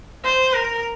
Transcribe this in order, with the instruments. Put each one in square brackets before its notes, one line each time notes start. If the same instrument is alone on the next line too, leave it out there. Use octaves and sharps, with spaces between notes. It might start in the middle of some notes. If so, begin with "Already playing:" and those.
[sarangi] C5
A#4